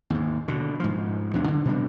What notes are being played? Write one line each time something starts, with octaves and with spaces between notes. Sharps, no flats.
D#2 G#2
B2 D3
G#2 F3
E2 G#2 C3 D4
D3
B2 G3 D4